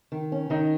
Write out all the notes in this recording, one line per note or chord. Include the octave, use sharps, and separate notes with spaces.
D#3
C#4
D#3 D#4